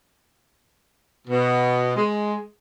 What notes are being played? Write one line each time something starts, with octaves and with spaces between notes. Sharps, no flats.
B2
G#3